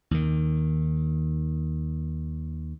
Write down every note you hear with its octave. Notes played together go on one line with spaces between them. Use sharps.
D#2 D#3